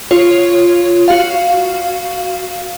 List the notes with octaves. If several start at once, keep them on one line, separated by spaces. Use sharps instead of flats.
F4 C#5
F#4 F5